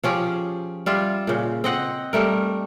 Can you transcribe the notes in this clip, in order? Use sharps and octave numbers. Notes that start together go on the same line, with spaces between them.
F3 C#4 G4 G#4
G3 F4 E5
A#2 C#3
C4 D#5 F#5
G3 A3 A#4